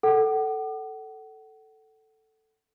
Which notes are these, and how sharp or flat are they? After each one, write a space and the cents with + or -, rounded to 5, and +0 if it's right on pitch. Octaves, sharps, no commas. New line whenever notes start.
A4 +0 F#5 +35